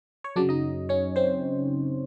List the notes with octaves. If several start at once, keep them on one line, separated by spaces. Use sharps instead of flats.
C#5
F#2 C#3 F#3 D4 D5
D#4 D#5
C#4 C#5
C4 C5